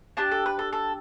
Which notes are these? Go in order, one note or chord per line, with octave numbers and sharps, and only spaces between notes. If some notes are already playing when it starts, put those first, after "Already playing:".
D4 G4 A5
A4
B4
A4
A4